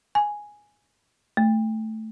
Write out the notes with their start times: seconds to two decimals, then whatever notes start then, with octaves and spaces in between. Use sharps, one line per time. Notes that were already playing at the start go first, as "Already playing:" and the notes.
0.15 G#5
1.37 A3